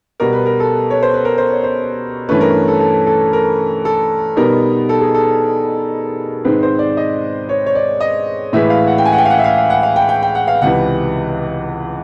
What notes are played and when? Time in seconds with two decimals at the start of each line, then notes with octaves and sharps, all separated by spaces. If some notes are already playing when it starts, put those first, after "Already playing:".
0.20 B2 G3 B3 A#4
0.33 B4
0.46 A#4
0.60 A4
0.90 C#5
1.03 C5
1.14 B4
1.25 A#4
1.38 C5
1.50 C#5
1.64 C5
2.29 G2 E3 A3 C#4 B4
2.41 A#4
2.68 A4
2.80 A4
3.06 A4
3.33 A#4
3.85 A4
4.36 B2 G3 B3 D#4 A#4
4.89 A4
5.01 G#4
5.14 A4
6.45 G#2 D#3 G#3 C4 B4
6.63 C5
6.79 D5
6.97 D#5
7.49 C#5
7.66 C#5
7.75 D5
8.00 D#5
8.53 A2 E3 G#3 E5
8.70 F5
8.87 F#5
8.98 G5
9.05 G#5
9.12 F#5
9.18 G5
9.25 F5
9.30 F#5
9.39 E5
9.44 F5
9.58 F5
9.70 F#5
9.83 F5
9.96 G5
10.09 G5
10.23 G5
10.35 F#5
10.48 F5
10.62 C#2 C3 E3 F#5